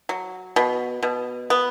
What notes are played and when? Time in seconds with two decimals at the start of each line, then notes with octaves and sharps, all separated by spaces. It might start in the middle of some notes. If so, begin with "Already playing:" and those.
0.09 F#3
0.56 B2
1.03 B2
1.50 B3